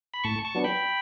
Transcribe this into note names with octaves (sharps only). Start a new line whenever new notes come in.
B5
A2 A5 C#6
A5 C#6
F#3 B3 D4
G5 B5